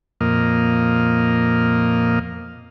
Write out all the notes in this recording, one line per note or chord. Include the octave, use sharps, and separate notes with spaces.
F2 A#2 A#3 D#5 F6